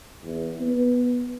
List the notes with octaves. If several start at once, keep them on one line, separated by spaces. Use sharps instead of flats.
E2
B3